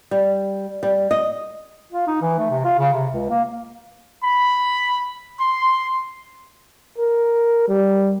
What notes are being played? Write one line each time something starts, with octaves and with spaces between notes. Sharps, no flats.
G3
G3
D#5
F4
D#4
E3
A3
C3
F4
C#3
C3
C#2
A#3
B5
C6
A#4
G3